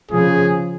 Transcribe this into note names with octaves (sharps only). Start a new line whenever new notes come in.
C#3 F3 G#4